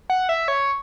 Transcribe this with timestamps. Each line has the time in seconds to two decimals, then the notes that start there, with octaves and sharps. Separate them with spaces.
0.10 F#5
0.29 E5
0.48 C#5